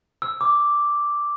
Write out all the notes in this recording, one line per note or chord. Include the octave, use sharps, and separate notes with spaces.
E6
D6